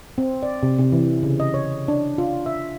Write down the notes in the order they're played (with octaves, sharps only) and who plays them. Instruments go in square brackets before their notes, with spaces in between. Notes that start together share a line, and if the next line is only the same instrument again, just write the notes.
[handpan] C4
D5
C3
C3
E3
C#3
D#5
C#5
D4
F4
E5